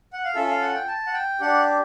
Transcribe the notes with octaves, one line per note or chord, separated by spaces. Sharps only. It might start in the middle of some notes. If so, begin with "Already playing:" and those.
F#5
F5
C#4 F4 A4 E5
F5
F#5
G5
A5
F#5
G5
D4 G4 F#5